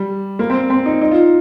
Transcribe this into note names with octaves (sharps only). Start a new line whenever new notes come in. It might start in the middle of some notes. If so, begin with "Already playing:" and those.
Already playing: G3
A#3
C4
C4
D#4
D#4
F4